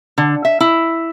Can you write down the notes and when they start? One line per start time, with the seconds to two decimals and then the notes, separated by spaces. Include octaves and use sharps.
0.18 D3
0.45 E5
0.60 E4